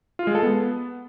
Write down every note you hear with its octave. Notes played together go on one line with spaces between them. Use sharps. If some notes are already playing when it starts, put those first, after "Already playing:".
F4
G#3
A4
B3